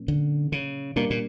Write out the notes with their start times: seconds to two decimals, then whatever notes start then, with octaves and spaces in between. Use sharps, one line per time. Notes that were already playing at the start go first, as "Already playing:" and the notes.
Already playing: A#2 F#3 A#3 C#4
0.08 D3
0.52 C#3
0.96 B2 G3 A#3 D4
1.10 A#2